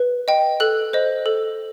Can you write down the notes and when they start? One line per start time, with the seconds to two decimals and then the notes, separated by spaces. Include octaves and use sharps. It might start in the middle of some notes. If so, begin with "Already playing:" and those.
Already playing: B4
0.28 D#5 G5
0.60 A4 F#6
0.93 C5 D#5
1.26 A4